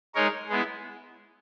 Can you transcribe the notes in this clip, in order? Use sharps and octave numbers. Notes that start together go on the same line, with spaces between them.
G#3 D#4 A#4 C#5
G#3 B3 E4